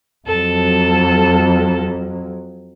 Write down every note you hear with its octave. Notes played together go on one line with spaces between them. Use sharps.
F2 F#3 A4